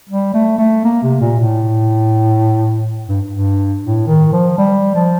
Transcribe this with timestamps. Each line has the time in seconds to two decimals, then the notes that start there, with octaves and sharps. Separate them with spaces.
0.10 G3
0.34 A3
0.59 A3
0.85 A#3
1.03 C3
1.21 A#2
1.40 A2
3.08 G2
3.31 G2
3.83 A2
4.07 D#3
4.33 F3
4.58 G3
4.95 F3